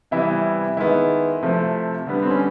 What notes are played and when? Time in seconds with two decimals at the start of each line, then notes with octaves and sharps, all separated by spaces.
0.11 C3 E3 G3 B3 E4
0.77 D#3 G#3 B3 E4
1.42 C3 F3 A3
2.07 D3 G3 B3
2.23 C4
2.30 C#4